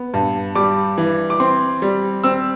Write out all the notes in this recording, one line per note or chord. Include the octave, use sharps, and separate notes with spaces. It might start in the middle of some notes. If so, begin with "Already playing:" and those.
Already playing: B3
G2
G3 D6
E3
D6
C4 C6
G3
C4 E6